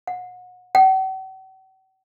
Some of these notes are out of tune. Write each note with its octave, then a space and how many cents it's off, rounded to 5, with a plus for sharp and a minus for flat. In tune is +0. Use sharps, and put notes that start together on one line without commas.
F#5 -30
F#5 +45